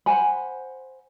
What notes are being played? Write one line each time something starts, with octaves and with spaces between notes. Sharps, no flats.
C5 F#5 G#5 B5